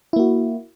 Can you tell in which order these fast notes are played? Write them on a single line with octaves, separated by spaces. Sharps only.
E4 A#3 F#4